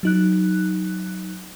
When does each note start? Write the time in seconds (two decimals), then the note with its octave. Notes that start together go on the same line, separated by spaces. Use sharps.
0.03 F#3 D#4 F#6